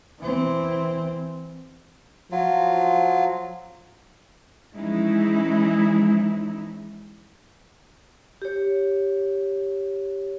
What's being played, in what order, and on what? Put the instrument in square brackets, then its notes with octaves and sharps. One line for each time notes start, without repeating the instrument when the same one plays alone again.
[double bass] E3 C4
[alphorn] F3 [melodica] F#3 F4
[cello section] E3 F3 G#3 C#4 D#4 E4
[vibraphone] G4 C#5